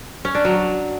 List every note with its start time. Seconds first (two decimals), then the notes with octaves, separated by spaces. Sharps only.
0.25 C#4
0.35 D4
0.45 F#3